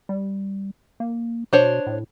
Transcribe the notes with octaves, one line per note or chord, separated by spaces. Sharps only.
G3
A#3
B2 D4 C5 C#5
A2